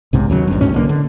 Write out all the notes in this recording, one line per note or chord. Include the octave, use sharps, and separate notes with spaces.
B1 G#2 C3
D#2 C#3 F#3
G#1 G2
A1 D2 G#2 C#4
B1 D3 A#3
D3